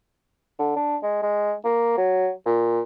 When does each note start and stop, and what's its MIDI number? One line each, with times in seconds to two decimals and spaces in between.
0.59 0.72 50
0.76 0.96 62
1.03 1.21 56
1.22 1.53 56
1.65 1.93 58
1.97 2.30 54
2.45 2.81 46